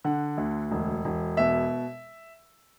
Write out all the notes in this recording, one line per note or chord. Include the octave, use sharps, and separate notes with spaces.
D3 F#5
D2
E1
E1
B2 E5